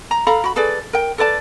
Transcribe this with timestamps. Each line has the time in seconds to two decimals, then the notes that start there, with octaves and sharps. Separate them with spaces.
0.11 A#5
0.27 A4 F5 A#5 B5
0.44 F#4 B5
0.56 G#4 A4 B4 D5
0.93 A#4 G5
1.18 A4 B4 D5 A5